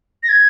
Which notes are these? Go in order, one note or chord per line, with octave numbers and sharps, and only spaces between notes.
A#6
G#6